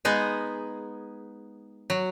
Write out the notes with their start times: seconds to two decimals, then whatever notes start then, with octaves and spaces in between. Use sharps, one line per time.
0.05 G#3 B3 D#4 G#4
1.90 F#3